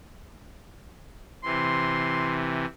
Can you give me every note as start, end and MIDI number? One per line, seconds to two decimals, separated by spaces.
1.44 2.65 48
1.44 2.65 52
1.44 2.38 84